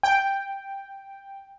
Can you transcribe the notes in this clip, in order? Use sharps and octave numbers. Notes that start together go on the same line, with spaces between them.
G5